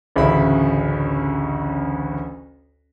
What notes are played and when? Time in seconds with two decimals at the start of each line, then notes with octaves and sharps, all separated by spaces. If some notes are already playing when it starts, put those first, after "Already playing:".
0.16 A1 D2 C#3 E4 B5